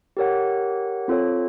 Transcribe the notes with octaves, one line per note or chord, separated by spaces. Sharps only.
G4 A#4 C#5 F#5
C4 F4 A4 C#5